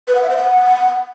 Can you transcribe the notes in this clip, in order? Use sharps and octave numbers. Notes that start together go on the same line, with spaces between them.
B4
F#5
E5
C5
F#5